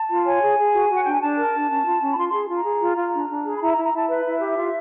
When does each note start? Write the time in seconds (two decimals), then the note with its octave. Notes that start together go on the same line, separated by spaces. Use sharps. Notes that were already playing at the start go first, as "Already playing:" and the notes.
Already playing: A5
0.10 F4
0.25 C#5 G#5
0.42 G#4
0.58 G#4
0.73 F#4
0.89 F#4 F#5
1.03 D4 G5
1.12 G#5
1.21 D4 A5
1.37 A#4
1.53 D4
1.69 C#4
1.86 F4
2.02 C#4
2.12 B5
2.17 F4 C6
2.29 G#4 C6
2.49 F4
2.54 A#5
2.65 G#4
2.81 F4
2.97 F4
3.14 D4
3.29 D4
3.45 G#4
3.55 B5
3.61 E4 A#5
3.73 A#5
3.76 E4
3.84 A#5
3.93 E4 A5
4.09 B4 E5
4.25 E4
4.41 G4
4.57 F4